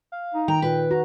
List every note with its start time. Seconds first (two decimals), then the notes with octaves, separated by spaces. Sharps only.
0.12 F5
0.34 D#4
0.48 D#3 G5 A#5
0.62 A#2 B4
0.91 F#4 A#5